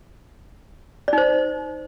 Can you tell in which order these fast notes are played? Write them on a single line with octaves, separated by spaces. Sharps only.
D5 D#4 C5